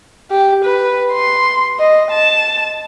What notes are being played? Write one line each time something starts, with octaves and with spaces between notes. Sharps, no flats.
G4
B4
C6
D#5
A5